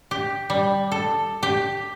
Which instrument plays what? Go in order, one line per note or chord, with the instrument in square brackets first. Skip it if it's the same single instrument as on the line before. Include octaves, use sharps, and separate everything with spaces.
[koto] G4
G3
A4
G4